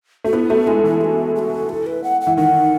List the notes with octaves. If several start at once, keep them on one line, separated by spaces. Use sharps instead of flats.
A3 F#4
B3 E4
A3 F#4
G#3 E4
E3 E4
G#4
F#4
G#4
F#4
A4
B4
F#5
F#5
E3
D#3 F#5